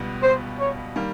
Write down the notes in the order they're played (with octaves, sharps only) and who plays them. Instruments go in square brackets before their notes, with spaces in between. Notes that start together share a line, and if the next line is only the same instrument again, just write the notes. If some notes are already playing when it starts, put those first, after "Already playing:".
Already playing: [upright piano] C#2 B2 G3 B3
[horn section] C5
C#5
[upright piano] D#3 G3 A#3